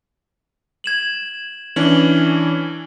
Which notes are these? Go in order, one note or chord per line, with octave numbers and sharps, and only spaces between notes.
G#6 E7 F#7
E3 C#4 D4 F#7 G7